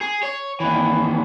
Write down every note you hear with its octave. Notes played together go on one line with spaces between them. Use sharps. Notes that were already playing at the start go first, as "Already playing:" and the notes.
G#4
C#5
D#2 E3